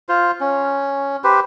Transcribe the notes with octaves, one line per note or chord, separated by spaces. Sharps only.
F4 C5
C#4
G4 B4 C5